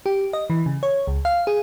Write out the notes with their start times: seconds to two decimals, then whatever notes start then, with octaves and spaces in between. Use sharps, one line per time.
0.06 G4
0.33 D#5
0.50 E3
0.66 C#3
0.83 C#5
1.07 C#2
1.25 F5
1.47 G#4